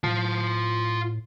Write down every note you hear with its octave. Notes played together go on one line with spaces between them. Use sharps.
A2 F4 A5